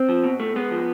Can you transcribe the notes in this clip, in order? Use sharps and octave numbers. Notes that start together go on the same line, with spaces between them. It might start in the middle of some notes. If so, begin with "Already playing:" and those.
Already playing: C4
F3
B2
A3
G#3 B3
F3